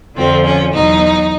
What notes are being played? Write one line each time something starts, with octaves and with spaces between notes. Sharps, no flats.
F2 D3 F3 C4
C#4
E2 B2 F#3 D#4